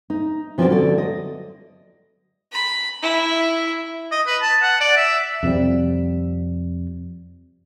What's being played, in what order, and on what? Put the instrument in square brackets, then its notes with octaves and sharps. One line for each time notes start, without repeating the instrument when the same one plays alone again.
[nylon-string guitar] D#4
E3 F3 C4 C#4 F#4 D5
D3 F#3 D5
D#5
[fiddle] B5
E4
[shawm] D#5
B4
A5
F#5
D5
E5
[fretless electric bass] F2 C3 F3 G3